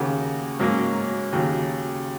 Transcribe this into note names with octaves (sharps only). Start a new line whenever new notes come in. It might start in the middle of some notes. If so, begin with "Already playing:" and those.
Already playing: D#2 C#3 A#3 F#4
G#2 F#3 A#3 C#4
D#2 C#3 F#3